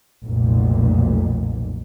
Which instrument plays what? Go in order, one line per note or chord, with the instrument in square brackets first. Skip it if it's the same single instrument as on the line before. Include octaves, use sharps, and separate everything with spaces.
[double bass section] F1 B1 A#2